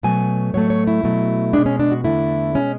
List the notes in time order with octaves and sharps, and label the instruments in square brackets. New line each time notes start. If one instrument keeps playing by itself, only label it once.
[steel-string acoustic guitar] B2 F#3 A3 G#5
A2 F#3 A3 C#5
C#5
E4
B2 F#3 A3
B2 G#3 D4
C#4
D4
F#4
E2 D3 A3 E4
B2 G#3 C#4